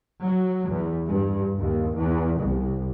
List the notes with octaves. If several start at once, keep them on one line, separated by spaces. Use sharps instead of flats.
F#3
E2
G2
D#2
E2
C2